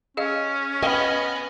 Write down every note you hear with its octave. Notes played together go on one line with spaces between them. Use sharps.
C#4 G#4 D#5 F5
B3 D#5 F5 G5 G#5